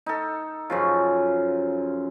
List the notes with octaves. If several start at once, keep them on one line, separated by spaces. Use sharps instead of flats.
D#4 A4
F#2 C#3 F3